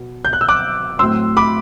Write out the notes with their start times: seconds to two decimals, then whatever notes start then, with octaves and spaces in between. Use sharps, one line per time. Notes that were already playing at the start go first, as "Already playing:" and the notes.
Already playing: B2 B3
0.25 G6
0.33 F#6
0.41 E6
0.48 D6 F#6
0.99 A2 F#3 C4 C6 E6
1.37 B5 D6